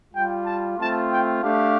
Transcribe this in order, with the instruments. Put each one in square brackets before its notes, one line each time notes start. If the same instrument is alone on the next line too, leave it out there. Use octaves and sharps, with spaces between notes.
[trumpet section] G3 F4 G5
A5
A3 C4 F4 A5
G5
A3 D4 G4 F5